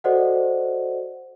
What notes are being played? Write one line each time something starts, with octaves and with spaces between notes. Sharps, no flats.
F#4 A4 C5 D5 D#5 F#5